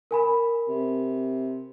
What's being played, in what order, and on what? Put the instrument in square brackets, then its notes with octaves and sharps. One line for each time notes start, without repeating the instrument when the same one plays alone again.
[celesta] A#4 G#5 B5
[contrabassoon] C3